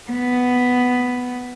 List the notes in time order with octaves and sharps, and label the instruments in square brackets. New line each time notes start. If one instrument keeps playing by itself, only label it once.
[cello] B3